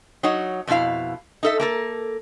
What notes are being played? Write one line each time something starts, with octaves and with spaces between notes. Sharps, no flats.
F#3 D#4 C#5 F#5
F2 B2 D3 E4 F5
D#4 A4 E5
A#3 A4 A#4